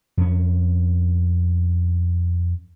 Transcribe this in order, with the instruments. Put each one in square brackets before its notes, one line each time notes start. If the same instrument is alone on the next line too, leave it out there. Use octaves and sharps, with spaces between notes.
[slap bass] F2 C#4